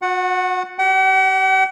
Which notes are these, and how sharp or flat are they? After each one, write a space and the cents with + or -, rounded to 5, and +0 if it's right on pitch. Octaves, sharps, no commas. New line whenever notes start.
F#4 -35 F#5 +0
G4 -30 F#5 +45